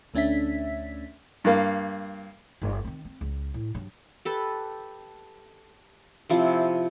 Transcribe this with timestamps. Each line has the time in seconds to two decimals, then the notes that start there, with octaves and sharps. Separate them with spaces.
0.14 D2 A3 C#4 D4 E5 B6
1.44 G2 A#3
2.62 G1
2.85 D#3 C4
3.05 C4
3.21 C#2
3.54 A2
3.75 G2 F#3
4.25 G4 A4 B4
6.30 C3 F3 E4